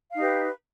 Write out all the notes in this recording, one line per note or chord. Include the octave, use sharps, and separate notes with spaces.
D#4 G4 B4 F5